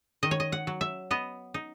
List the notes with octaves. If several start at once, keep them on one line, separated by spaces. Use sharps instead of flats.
D#3 D#5
C#5
D#5
F#5
F#3
E5
B3 D#5
D#4